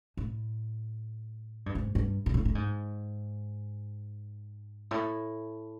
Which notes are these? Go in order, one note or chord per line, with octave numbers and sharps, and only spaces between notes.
A2
G2
G#2
G2
A#2
A2
A2
G#2
A2